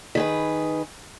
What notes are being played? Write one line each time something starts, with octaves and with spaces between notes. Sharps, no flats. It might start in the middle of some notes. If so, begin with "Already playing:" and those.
D#3 G#4 B4